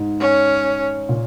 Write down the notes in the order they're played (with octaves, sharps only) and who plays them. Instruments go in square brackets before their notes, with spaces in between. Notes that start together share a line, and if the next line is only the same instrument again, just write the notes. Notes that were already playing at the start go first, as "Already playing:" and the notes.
Already playing: [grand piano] G#2
[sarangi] C#4
[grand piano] A#2